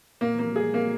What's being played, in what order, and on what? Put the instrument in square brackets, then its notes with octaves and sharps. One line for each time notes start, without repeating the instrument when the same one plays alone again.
[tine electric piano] A#2 [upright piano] A#3
[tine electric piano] E3 [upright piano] A#3
[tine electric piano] F3
G#3
[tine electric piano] G3 [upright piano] G#4
[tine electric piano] G#3 [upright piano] A#3